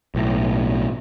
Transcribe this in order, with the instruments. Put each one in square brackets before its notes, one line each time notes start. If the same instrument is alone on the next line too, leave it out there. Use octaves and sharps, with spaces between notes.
[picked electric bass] B1 A2